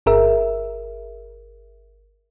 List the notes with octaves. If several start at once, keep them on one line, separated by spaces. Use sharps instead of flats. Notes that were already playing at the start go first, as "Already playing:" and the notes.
G1 G#4 A#4 E5